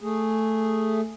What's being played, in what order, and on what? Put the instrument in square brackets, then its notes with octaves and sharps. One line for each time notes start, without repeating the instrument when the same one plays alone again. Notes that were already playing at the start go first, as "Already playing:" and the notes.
[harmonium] A3 G#4